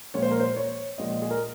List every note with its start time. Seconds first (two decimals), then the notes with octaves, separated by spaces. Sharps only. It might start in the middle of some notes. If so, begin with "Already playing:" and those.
0.14 A#1 A#2 G#3 C#5
0.22 C5
0.31 A#4
0.40 C5
0.57 C#5
0.98 A#1 A#2 G#3 D#5
1.22 G#4
1.31 A#4